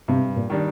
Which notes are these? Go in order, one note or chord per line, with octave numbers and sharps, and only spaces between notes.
G2 C3
A#2
D#3 G3 D4